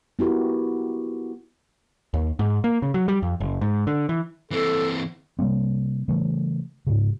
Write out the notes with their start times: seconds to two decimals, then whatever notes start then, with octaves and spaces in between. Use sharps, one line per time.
0.19 B3 E4 F#4 G4 A#4
2.14 D#2
2.39 G#2
2.64 A#3
2.82 C#3
2.94 F#3
3.08 G3
3.22 F2
3.40 F#1
3.61 G#2
3.87 D3
4.09 E3
4.51 E3 C4 A4
5.39 C3 G3 A#3 C4
6.08 C#3 E3 G3 A3
6.87 G#2 C#3